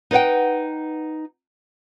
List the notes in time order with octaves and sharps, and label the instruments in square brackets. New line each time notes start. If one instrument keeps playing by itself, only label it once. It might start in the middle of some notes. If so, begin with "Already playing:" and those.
[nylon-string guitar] D#4 B4 D5 F#5 G5